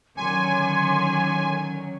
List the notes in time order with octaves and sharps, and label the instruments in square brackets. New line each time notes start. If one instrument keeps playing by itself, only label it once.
[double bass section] D3 D#3 C#4 [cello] F#3 [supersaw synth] G#5 [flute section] C6 D6 G#6